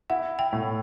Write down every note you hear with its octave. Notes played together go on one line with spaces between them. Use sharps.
E4 F#5
G5
A2